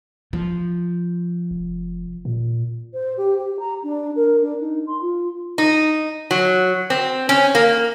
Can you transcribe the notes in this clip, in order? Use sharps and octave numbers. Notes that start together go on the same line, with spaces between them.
F3
F1
A#2
C5
G4
G4
A#5
D4
A#4
D4
D#4
C6
F4
D#4
F#3
C4
C#4
A#3